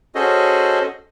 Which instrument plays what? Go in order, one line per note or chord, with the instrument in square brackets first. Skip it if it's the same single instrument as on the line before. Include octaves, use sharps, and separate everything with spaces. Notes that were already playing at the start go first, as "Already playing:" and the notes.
[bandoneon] C#4 F#4 G#4 A4 C5 D#5